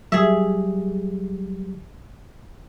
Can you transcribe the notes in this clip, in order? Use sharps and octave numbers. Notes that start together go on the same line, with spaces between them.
F#3 G3 G4 G#4 E5